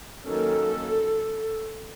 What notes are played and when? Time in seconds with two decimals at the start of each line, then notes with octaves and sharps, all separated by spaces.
0.25 D#3 F#3 A#3 C#4 A4